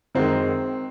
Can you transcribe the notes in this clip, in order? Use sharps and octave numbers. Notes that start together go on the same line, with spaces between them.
F#2 D#3 G#3 C4